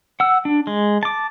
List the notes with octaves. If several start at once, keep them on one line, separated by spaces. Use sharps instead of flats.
F#5 E6
D4
G#3
A5 D6